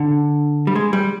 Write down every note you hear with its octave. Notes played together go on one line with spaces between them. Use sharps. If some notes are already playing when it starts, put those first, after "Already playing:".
Already playing: D3
G3
G#3
G3